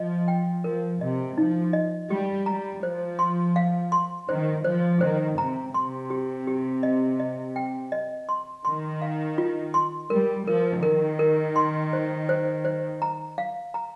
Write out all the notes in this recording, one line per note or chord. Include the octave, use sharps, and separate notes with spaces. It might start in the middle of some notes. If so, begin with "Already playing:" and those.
Already playing: F3 D#5
G5
F3 A#4
C3 D#5
F3 D#4
D#5
G3 G4
G3 A#5
F3 C5
C6
F5
C6
D#3 C5
F3 C5
D#3 C5
C3 A#5
C3 C6
G4
G4
D#5
D#5
G5
D#5
C6
D#3 C6
F5
F4
C6
G3 A#4
F3 A#4
D#3 A#4
A#4
C6
C5
C5
C5
A#5
F5
A#5